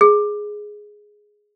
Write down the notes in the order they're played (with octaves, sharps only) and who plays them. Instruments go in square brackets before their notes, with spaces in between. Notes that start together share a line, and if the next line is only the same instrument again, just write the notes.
[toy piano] G#4